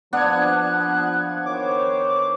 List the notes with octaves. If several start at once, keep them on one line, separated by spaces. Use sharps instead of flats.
F3 B3 D4 F#5 F#6 G#6
D#3 C5 C#5 D6